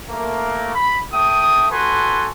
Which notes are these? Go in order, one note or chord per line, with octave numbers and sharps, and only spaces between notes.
A3 A#3
B5
A3 G5 D#6
F#4 A4 B4 G#5 C6